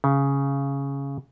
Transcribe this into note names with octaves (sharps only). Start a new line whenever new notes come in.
C#3